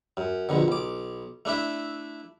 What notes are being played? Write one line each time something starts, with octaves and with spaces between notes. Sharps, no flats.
F#2
A#1 B2 D3
B1 D6
A3 D4 E4 E5